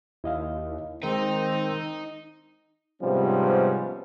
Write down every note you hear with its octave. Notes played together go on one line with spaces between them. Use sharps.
D#2 E4 D#5 F5
D#3 G#3 C4 D#4 A#4
G#2 C3 F3 G3 B3 C#4